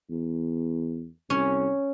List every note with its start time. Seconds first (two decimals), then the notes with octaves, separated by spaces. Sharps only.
0.10 E2
1.30 C2 C#4